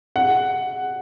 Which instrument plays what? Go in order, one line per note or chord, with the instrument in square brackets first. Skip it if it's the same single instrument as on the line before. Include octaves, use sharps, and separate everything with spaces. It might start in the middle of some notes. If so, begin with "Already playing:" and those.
[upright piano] F#5